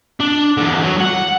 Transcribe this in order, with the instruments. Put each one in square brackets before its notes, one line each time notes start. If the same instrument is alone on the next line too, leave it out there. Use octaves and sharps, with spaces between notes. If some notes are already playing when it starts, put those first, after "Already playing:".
[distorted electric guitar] D4
E2 D3
F#3
F#5